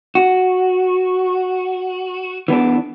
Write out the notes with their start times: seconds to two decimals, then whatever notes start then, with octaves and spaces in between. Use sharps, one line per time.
0.15 F#4
2.48 E3 B3 D4